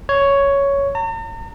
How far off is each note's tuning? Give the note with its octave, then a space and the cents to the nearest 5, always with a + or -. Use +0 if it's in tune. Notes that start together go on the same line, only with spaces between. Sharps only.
C#5 +5
A#5 -45